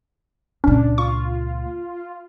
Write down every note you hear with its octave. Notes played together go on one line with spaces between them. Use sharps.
C#2 A#2 C#4 D4
F4 C#6